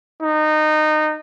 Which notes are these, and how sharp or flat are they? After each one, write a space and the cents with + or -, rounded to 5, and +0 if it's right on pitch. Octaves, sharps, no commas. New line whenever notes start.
D#4 -20